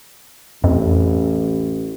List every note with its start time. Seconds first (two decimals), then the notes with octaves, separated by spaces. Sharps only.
0.64 A1 F2